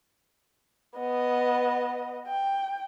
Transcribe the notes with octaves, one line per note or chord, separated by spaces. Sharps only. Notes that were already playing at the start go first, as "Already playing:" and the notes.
B3 D#5
G5